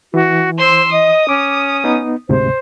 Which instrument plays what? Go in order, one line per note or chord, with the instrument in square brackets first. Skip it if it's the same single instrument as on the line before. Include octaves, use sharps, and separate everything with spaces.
[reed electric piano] E3 [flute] F#4
[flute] C5 [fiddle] C6 E6
[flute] D#5 [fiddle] D#6
[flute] C#4 [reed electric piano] D6
[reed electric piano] B3 D#4
[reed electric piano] D2 G#2 C3 [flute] C5